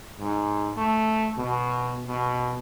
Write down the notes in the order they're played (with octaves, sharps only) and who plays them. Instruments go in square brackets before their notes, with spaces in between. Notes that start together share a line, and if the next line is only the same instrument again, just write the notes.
[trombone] G#2
A3
B2
B2